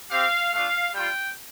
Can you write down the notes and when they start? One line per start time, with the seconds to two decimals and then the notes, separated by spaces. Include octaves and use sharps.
0.11 C4 G4 F5
0.52 A3 D4 F4 F5
0.94 G3 F4 G5